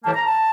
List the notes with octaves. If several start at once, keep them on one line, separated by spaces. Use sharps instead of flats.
A2 E3 G3 A#3 A5
A#5
A5